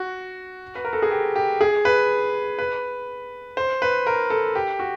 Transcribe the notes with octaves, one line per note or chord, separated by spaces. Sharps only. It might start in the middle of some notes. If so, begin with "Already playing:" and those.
Already playing: F#4
B4
A#4
A4
G#4
G4
G4
G#4
B4
B4
C5
B4
A#4
A4
G4
F#4